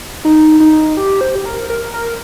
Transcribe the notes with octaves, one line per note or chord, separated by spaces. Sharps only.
D#4
D#4
G4
C5
G4
A#4
A#4
A#4